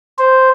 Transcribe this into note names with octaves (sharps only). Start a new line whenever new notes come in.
C5